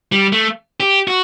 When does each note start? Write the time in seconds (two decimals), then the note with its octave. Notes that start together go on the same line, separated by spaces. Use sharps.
0.12 G3
0.33 A3
0.80 G4
1.08 F#4